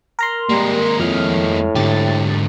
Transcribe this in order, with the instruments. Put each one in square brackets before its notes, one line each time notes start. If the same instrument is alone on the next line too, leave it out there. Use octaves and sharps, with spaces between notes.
[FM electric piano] A#4 A#5 C6
[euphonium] G3 [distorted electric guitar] G#3 A#3
[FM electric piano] F2 F6 [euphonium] A2
[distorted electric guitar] G#2 D3 [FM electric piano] G4 A6